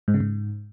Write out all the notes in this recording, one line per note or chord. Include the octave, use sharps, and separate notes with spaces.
G#2
C#3
G#2